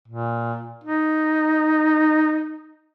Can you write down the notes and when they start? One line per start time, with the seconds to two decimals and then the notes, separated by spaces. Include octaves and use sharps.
0.08 A#2
0.84 D#4